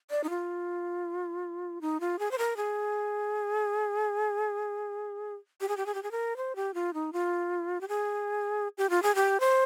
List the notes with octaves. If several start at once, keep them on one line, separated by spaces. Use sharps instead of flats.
D5
D#4
F4
D#4
F4
G#4
C5
A#4
G#4
G4
G#4
G4
G#4
G4
G#4
A#4
C5
G4
F4
D#4
F4
G4
G#4
G4
F4
G#4
G4
C5